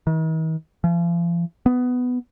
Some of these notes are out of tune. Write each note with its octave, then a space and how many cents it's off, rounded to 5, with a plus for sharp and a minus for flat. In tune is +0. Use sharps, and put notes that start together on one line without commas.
D#3 +45
F3 -40
B3 +10